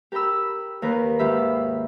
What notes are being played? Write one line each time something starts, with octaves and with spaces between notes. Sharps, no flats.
G4 A#4 G5 B5 E6
D#2 A#4 B4 F#6
D#2 G#2 F4 G4 E5 B5